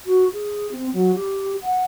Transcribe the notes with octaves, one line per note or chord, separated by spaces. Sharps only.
F#4
G#4
C4
F#3
G4
F#5